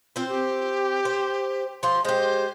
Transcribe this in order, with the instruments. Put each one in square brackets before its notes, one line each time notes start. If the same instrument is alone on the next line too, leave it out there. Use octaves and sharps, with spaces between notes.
[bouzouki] C4 C5 [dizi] F4
[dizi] G4
[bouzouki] C5
[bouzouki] F3 F4 [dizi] C6
[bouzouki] G#3 G4 [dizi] C5